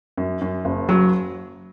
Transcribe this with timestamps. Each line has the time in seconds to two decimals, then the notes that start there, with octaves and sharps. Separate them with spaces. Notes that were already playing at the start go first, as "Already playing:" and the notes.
0.17 F#2
0.41 F#2
0.65 F#1
0.89 F#3